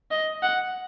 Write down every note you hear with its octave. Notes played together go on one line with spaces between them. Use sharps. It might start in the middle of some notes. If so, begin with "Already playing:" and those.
D#5
F#5